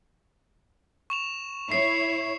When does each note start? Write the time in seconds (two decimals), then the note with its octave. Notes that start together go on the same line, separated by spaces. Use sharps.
1.10 C#6 E7 F7
1.72 E4 C#5 C7